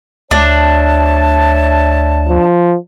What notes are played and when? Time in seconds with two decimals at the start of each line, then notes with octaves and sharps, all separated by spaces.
0.31 D2 D4 C#5 E5 A5
2.29 F3